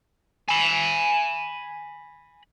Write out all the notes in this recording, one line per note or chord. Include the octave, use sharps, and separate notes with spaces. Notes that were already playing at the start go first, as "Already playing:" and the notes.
G#5 B5